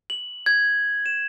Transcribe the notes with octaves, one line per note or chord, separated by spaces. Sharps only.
F#7
G#6
E7